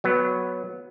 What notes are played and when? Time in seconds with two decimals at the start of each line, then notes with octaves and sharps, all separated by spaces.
0.04 F#3 B3